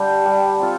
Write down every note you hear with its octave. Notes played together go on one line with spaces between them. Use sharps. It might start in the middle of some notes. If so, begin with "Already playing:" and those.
Already playing: D3 G3 D4 G4
G3
C4 F4 A4